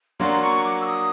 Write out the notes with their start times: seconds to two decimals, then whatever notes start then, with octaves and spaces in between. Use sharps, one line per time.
0.20 F#3 A#3 D4 F#4 C6
0.42 C#6
0.64 D6
0.81 E6
0.86 D#6